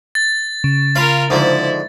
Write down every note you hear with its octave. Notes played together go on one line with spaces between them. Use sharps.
A6
C#3
F4 A#4 F5 B5
G#2 D3 F3 E4